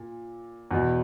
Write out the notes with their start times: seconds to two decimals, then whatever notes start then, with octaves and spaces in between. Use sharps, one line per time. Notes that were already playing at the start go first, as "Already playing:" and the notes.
Already playing: A#2
0.71 E2 B2